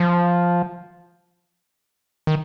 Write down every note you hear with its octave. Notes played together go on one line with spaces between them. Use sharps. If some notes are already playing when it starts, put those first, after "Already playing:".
Already playing: F3
D#3